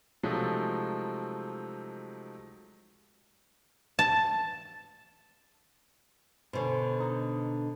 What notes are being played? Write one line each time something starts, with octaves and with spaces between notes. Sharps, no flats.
C3 F3 F#3 G#3 A3 D#4
A5
B2 D3 C#4 C5
D#4